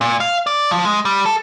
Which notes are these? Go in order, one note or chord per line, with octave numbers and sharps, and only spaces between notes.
A#2
F5
D5
F3
G#3
G3
A4